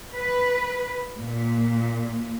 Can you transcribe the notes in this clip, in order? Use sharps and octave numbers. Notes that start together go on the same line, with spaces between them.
B4
A#2